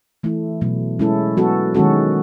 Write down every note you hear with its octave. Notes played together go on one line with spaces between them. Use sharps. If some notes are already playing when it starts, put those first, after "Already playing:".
E3 A3 E4
B2 F#3 A3
G#3 C#4 E4 A4
F#3 B3 F#4 A4
D#3 G#3 C#4 F#4 A4